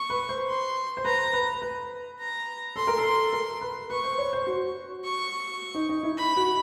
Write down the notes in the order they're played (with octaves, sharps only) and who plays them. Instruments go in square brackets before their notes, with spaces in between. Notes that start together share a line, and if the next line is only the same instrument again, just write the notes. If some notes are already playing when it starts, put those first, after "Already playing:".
Already playing: [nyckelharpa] C#6
[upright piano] B4
C5
[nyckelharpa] C6
[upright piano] C5
[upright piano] B4 [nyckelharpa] A#5
[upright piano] B4
B4
[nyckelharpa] A#5
[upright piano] A4 [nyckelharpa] C6
[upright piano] A#4
A4
A#4
B4
[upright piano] B4 [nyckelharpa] C#6
[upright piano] C5
C#5
C5
F#4
[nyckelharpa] C#6
[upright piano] D#4
D#4
E4
[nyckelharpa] B5
[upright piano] F#4